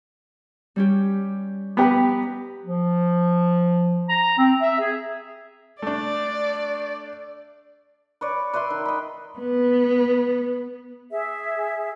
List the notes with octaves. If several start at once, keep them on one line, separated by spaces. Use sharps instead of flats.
G3 C#4 G4
B3 G4 B4 A#5 B5
F3
A#5
C4
E5
G#4
A3 D4 D5
B4 C#5 D5
B4 D5 E5 C6
D#3
D#5 B5
B3
G#4 E5